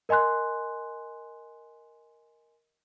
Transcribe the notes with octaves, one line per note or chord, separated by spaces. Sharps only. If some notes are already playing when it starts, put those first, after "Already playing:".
A#4 D#5 G#5 C6 F#6